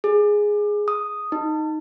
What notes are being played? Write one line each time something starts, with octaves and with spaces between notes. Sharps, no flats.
G#4
D#6
D#4